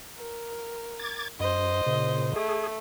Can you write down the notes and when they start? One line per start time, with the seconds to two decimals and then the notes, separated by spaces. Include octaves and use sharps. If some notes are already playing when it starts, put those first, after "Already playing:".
0.18 A#4
0.99 D6 G#6 A6
1.40 F#2 C5 D#5
1.86 A#2 C#3
2.36 A3 G#4